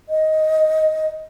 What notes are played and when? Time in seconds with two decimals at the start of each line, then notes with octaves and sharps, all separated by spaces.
0.09 D#5